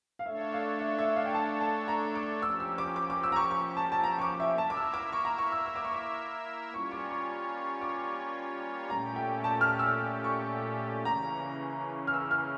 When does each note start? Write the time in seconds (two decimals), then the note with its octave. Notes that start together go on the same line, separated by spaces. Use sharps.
0.19 F5
0.26 A3 D4 A4 C#5 E5
0.53 F5
0.80 E5
0.98 E5
1.16 F5
1.26 G5
1.35 A5
1.61 A5
1.88 A#5
2.15 D6
2.42 F3 A#3 C#4 G4 E6
2.60 E6
2.78 D6
2.96 D6
3.10 D6
3.23 E6
3.32 A#5
3.36 C#6
3.51 C#6
3.77 A5
3.92 A5
4.04 A#5
4.18 C#6
4.21 D6
4.40 E5
4.57 A#3 E4 A#4 E5 A5
4.70 D6
4.76 E6
4.94 D6
5.13 C#6
5.25 A#5
5.38 C#6
5.52 E6
5.66 E6
5.76 D6
5.84 C#6
5.94 D6
6.74 G3 A#3 C#4 F4 C#5 C#6
6.92 D6
7.10 C#6
7.81 D6
8.90 A#2 A3 C#4 G4 A#5
9.16 G5
9.44 A5
9.61 F6
9.79 E6
10.24 C#6
11.05 C#3 E3 A#3 C#4 A#5
12.07 F6
12.14 E6
12.31 F6